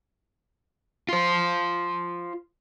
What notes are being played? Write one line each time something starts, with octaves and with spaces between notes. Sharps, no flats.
F4 C5